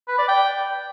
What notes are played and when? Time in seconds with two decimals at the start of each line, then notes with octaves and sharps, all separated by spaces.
0.08 B4
0.18 D5
0.28 G5